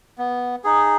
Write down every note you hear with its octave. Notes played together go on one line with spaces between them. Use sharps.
B3
D#4 G#4